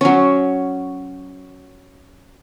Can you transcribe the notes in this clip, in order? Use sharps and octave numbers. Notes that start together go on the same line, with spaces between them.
F#3 C#4